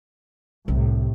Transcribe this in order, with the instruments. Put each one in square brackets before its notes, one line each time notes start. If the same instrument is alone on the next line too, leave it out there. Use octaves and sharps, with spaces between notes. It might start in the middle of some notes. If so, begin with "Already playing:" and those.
[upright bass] C2 [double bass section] A2 C3